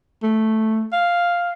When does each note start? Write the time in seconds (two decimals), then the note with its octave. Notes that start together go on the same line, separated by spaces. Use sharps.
0.23 A3
0.93 F5